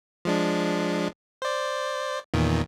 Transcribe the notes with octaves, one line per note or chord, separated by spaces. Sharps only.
F3 G#3 D4
C5 D5
E2 A#2 D#3